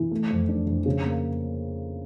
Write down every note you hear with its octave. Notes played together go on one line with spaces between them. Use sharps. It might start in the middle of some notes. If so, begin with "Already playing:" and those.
Already playing: E3
A3
F2
D4
F2
C#3
A#3